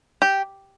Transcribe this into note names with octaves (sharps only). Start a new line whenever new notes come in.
G4